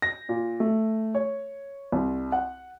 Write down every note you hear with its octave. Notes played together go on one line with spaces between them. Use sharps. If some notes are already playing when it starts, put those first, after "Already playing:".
A#6
A#2
A3
C#5
C2
F#5